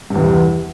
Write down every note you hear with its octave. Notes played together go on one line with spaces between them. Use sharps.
E2 G2 C3